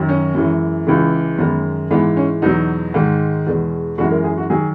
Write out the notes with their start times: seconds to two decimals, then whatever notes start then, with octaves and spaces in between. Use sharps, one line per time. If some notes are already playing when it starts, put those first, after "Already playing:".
Already playing: F#2 D#3 F#3
0.09 C#4
0.35 F#2 E3 G#3
0.87 C#2 C#3 E3 G#3
1.38 F#2 D#3 G#3 B3
1.91 G#2 E3 G#3 B3
2.17 C#4
2.42 E2 B2 F#3 D#4
2.94 G#2 D#3 G#3
3.47 E2 B2 G#3
3.98 F#2 E3 G#3 F#4
4.11 A#4
4.24 G#4
4.37 F#4
4.50 D#3 F#3 G#4